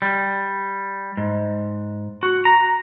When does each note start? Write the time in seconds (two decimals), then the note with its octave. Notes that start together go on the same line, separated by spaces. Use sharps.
0.02 G3
1.17 G#2
2.23 F#4
2.45 A#5